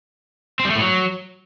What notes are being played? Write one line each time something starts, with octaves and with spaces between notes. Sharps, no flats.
C4
G3
A3
A2
F#3